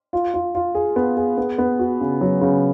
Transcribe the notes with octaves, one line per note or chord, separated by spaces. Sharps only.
F4
F4
F4
G#4
B3
G#4
B3
B3
F#4
C#3
F#3
C#3